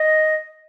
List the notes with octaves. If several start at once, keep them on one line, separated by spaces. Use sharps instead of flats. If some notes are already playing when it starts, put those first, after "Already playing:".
Already playing: D#5